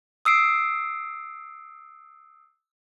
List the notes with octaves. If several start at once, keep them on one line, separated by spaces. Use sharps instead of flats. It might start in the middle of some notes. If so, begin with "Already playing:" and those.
D#6 E6 C7 D7